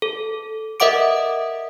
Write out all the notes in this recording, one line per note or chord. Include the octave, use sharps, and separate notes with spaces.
A4
A#4 D#5 E5 F#5 D6 D7